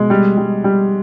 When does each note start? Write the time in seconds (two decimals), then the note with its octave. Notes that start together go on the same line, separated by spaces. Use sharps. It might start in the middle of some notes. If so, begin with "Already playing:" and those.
Already playing: B2 G#3
0.10 G3
0.37 G3
0.64 G3